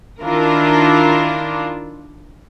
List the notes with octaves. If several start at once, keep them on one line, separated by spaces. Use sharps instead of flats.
D#3 D4 E4 F4 A#4